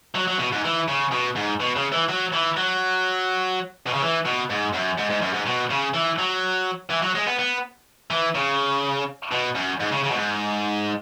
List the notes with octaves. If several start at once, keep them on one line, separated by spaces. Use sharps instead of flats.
F#3
F#3
B2
G#2
E3
C#3
B2
G#2
B2
C#3
E3
F#3
E3
F#3
B2
C#3
E3
B2
G#2
F#2
G#2
G#2
F#2
G#2
B2
C#3
E3
F#3
E3
F#3
G#3
B3
B3
E3
C#3
B2
F#2
G#2
C#3
C#3
B2
G#2